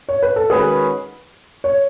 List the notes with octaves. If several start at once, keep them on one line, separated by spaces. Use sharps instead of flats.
C#5
B4
A4
D#3 G#3 C#4 F#4 G#4 B4
C#5